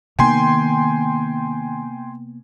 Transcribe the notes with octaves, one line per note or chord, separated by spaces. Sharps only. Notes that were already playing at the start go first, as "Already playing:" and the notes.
C3 D#3 A#3 B3 G5 G#5 C6